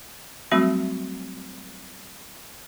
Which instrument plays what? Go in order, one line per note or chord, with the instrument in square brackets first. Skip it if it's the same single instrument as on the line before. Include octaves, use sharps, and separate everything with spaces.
[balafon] F#3 G3 A3 C4 F#4 B5